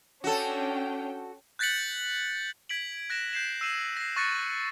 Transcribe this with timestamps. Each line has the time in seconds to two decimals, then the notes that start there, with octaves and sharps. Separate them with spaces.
0.24 C#4 D4 F#4 A4 G5
1.59 F#6 G6 A6 B6 C#7 F#7
2.69 G#6 B6 D7 F#7
3.10 F#6 A#6 D7 E7
3.33 G6 C7 E7
3.61 E6 C7 D#7 E7 F#7
3.97 A#6 C7
4.16 C#6 F#6 A6 A#6 C#7 D#7